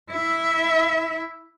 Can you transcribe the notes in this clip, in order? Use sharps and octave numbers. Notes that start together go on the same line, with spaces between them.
E4 E5